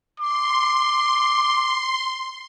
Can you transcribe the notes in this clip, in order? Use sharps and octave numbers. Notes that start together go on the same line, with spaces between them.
C6 D6